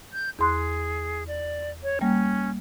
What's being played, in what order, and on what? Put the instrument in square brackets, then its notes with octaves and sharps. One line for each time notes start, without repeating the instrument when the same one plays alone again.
[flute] G6
[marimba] E2 C6 F#6 [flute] G#4
[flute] D5
C#5
[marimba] G3 A#3 [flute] C#4